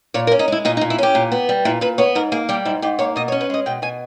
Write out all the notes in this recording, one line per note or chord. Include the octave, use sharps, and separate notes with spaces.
A#2 C#5
A#4
C#4
D#4
G#3 E4
A#2 D#4
D#4
A#2
E4
C#4 G4
A#2
B3
G3
A#2 E4
A#2 B4
B3 C#5
G#2 A#4
A#3 G#4
G3 G4
G#2 E4
G#2 G4
A#3 C#5
B2 D#5
C#5
C#4
B4
G#3 D#5
B2 G5
B2 G#5